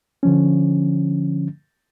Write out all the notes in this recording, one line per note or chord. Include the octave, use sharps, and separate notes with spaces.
D3 F3 C#4